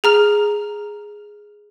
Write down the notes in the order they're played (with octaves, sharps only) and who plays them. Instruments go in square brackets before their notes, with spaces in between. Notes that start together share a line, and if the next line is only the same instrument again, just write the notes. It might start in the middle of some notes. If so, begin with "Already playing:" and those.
[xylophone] G#4 A#5 F6